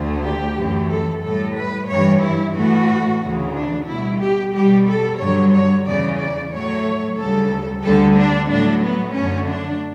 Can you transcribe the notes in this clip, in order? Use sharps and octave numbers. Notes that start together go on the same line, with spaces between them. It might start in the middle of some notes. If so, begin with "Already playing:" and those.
Already playing: D2 D3 A3
G4
F#2 E3 A3
A4
A2 G3 A4
B4
G2 E3 G3 C#5
E4
A2 E3 A3 F#4
D2 C#3 E3
D4
B2 G3 E4
G4
B2 G3 G4
A4
G2 D3 F#3 C#5
C#5
E2 C#3 E3 D5
D5
A2 F#3 A3 C#5
D2 C#3 G3 A4
D2 D3 G3 A4
D4
A2 F#3 A3 D4
B3
F#2 D3 A3 C#4
D4